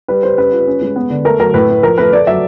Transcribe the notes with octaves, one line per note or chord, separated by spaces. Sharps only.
G3 B4
G3 C5
C#4 B4
F4
C#4
G#3
B3
D3
A3 A#4
F#3 A#4
A2 B4
A3
F3 A#4
A3 B4
A3 D5
F#3 E5